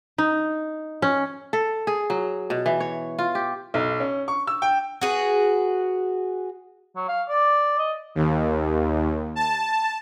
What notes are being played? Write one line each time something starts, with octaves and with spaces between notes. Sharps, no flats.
D#4
C#4
A4
G#4
F#3
B2
E3
C#5
F4
G4
B1
C#4
C#6
E6
G5
F#4 G#4 B4
F#3
F5
D5
D#5
D#2
A5